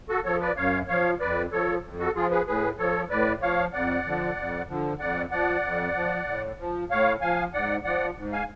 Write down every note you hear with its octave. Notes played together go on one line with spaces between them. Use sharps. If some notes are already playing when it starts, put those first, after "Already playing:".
F#4 A4
F3 A4 C#5
B4 D5
F#2 C#5 F5
F3 C#5 F5
F2 B4 D5
F3 A4 C#5
F2
F#4 A4
F3 F4 G#4
G#4 B4
A2 G#4 B4
F3 A4 C#5
A2 B4 D5
F3 C#5 F5
F2 D5 F#5
D3 F3
F2
D3 F3
F2 D5 F#5
F3 D5 F#5
F2
F3
A2
F3
A2 C#5 F5
F3 F5 G#5
G#2 D5 F#5
F3 D5 F#5
G#2
F5 G#5